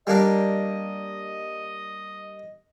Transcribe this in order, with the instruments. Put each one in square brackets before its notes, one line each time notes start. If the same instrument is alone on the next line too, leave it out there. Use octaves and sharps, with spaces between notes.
[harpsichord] G3 A#3 D4 [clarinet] D#5